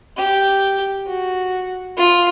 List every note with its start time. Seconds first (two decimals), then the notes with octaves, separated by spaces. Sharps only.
0.17 G4
1.07 F#4
1.97 F4